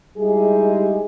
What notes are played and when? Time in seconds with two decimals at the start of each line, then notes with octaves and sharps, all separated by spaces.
0.17 G3 G#3 D#4 E4 G4 G#4